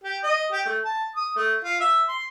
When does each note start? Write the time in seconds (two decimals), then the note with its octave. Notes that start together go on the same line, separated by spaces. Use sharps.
0.03 G4
0.23 D#5
0.52 G4
0.65 A3
0.84 A5
1.16 D#6
1.36 A3
1.64 F4
1.81 E5
2.08 C6